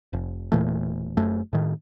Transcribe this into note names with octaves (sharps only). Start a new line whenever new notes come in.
F1
E1 A#2 E3 A3
F#1 F#2 A3
A2 D#3